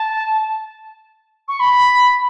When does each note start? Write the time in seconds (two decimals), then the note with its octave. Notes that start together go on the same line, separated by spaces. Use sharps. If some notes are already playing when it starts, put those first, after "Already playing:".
Already playing: A5
1.48 C#6
1.59 B5